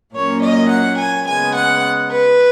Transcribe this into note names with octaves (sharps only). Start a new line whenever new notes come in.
A#2 F#3 A#3 C#4 C#5
D#5
F#5
G#5
C#3 G#3 B3 G#5
F#5
B4